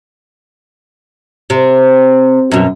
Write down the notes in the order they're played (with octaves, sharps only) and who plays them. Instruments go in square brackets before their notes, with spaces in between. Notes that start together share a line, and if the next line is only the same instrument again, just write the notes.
[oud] C3
F#2 B2